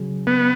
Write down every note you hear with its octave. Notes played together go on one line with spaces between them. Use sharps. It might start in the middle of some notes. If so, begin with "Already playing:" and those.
Already playing: C#3 F#3 C#4
B3